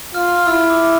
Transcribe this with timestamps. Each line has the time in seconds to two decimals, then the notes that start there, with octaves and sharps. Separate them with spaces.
0.14 F4 F6
0.36 F6
0.47 E4 E6
0.70 D6